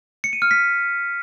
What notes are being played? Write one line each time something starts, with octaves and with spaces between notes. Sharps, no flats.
C#7
D#7
F6
B6